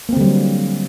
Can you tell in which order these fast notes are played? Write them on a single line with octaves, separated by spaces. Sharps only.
A#3 C4 D3 G3 F#3